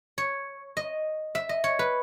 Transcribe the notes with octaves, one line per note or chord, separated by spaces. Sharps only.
C#5
D#5
E5
D#5
C#5
B4